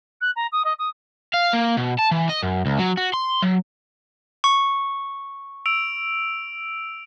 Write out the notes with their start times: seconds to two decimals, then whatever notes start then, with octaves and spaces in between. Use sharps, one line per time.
0.21 F#6
0.36 A#5
0.52 D#6
0.65 D#5
0.79 D#6
1.34 F5
1.53 A#3
1.77 B2
1.99 A5
2.11 E3
2.29 D#5
2.43 F#2
2.66 C#2
2.79 F#3
2.97 F#4
3.14 C6
3.42 F#3
4.44 C#6
5.66 E6 D7 F7